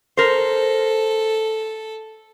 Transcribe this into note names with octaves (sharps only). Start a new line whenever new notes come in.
A4 A#4 C5